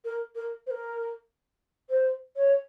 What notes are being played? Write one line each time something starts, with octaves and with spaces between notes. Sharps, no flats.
A#4
A#4
C5
A#4
C5
C#5